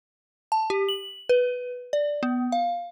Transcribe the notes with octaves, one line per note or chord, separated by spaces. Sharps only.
A5
G4
F#7
B4
D5
B3
F5